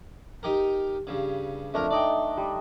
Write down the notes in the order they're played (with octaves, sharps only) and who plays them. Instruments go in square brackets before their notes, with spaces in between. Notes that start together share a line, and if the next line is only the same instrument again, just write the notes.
[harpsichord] D#4 G4 A#4
G2 C#3
[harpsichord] F2 A#4 A#5 [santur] A3 D4
[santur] D4 D#4 D#5 [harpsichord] D5 G5
[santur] G3